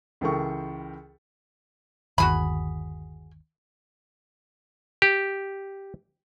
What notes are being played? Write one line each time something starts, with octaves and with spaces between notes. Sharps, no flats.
C#2 E3 A4 A#4 G5 C#6
G1 D#2 F#4 G#4 B5
G4